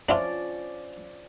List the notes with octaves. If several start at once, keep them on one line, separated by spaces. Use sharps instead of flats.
F3 C#4 D4 E4 F4 D5